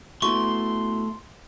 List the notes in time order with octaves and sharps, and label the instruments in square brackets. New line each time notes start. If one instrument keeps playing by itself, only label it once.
[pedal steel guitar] A3 [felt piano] B3 E4 F#4 [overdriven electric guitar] C6 [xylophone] C#6